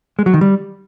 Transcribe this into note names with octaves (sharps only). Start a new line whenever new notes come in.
G#3
F#3
D#3
G3